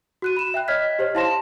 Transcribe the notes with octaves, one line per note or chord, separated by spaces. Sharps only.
F#4 F#6 D#7
B5 E7
E5 G5 F#6
C#5 D#5 F6 G#6 B6
G4 C5 C#5 D#5
E4 F5 A5 C6 A#6 E7